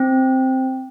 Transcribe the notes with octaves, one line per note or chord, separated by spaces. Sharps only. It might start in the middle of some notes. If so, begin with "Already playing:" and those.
Already playing: C4